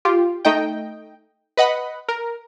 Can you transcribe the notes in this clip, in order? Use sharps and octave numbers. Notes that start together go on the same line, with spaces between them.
F4 G4
A3 D#4 D#5 G5
B4 D#5 F#5 B5
A#4